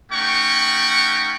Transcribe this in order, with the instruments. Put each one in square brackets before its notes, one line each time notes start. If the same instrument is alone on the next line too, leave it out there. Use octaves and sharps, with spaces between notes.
[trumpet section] A3 C#4 D#4 F#5 G5 C#6